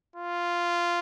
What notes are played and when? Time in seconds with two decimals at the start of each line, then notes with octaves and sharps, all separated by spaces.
0.16 F4